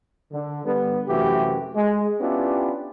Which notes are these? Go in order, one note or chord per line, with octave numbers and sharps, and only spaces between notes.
D3
D3 G3 B3
F#2 C3 E3 A3 F#4 G4
G#3
B3 C#4 D4 E4 F4 G4